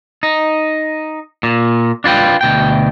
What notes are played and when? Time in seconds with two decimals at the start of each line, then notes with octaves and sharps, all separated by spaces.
0.23 D#4
1.43 A#2
2.04 D4 F4 B4 G5
2.41 D2 B2 G5